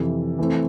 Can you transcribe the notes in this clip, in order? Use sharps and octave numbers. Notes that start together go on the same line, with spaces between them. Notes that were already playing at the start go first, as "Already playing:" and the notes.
Already playing: F2 C3 E3
E3 A3 C4